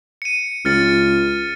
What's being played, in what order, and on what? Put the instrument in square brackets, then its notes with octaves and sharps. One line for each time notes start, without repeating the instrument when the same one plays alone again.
[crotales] C#7 D#7
[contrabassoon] C#2 [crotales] F6 A6 C#7